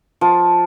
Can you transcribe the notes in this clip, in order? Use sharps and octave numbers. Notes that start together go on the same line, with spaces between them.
F3